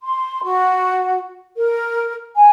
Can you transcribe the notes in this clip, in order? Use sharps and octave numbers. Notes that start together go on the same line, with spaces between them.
C6
F#4
A#4
G#5